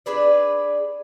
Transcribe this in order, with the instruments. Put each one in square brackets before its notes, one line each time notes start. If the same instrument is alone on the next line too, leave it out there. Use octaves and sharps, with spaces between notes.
[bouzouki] D4 G#4 B4 D5